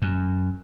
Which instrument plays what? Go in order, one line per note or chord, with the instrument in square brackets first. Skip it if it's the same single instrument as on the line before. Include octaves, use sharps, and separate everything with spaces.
[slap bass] F#2